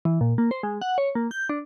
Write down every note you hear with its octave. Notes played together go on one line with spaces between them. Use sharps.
E3
A#2
A#3
C5
G#3
F#5
C#5
A#3
G6
D4